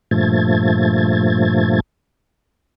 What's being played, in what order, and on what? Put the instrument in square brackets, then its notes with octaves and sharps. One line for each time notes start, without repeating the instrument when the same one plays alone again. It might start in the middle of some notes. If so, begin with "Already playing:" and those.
[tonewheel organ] G2 A#2 F3 A3 G#6 A6